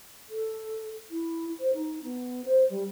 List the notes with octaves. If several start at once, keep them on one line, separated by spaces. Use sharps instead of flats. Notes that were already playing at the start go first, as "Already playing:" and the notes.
A4
E4
C5
D#4
B3
C5
G3